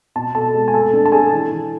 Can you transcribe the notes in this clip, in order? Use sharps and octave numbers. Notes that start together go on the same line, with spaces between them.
B2 A5
B2 A4 A5
G#3
G#5
A3 A4 A5
D4
A5
D4 G#4 G#5
E3
E3